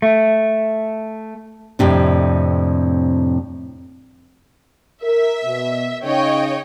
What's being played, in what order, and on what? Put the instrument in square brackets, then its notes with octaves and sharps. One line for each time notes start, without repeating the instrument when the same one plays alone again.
[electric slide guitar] A3
[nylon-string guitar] F2 A2 C3 D4
[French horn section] A#4 [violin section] E5
[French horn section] B2
[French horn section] C#3 D#4 [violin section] C#5 D#5 G5